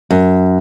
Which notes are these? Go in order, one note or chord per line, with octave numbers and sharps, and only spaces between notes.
F#2